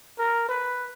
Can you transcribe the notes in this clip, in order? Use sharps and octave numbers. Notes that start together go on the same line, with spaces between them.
A#4
B4